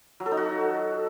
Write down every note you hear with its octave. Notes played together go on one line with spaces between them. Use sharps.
F#3
A4
D#4
F#4